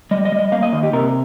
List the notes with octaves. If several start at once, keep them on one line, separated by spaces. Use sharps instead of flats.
G3 D#5
D#5
G3
D#5
A#3 F5
D#5
D#3 D#5
G4
C3 A#4